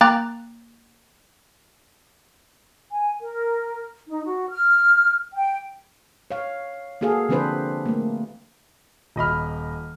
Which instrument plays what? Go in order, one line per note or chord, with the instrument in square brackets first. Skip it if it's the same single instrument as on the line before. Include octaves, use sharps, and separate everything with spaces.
[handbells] A#3 G5 A#5 D6 F#6 A6
[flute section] G#5
A#4
D#4
F#4
F6
G5
[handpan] C#5 F5
A#3 F#4 G#4 A4 F5
D3 F3 C4 D4 B4 C5
A3 A#3
[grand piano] D#1 D#5 B5 F6